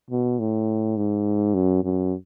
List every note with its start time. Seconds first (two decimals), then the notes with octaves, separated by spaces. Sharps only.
0.11 B2
0.39 A2
0.97 G#2
1.54 F#2
1.84 F#2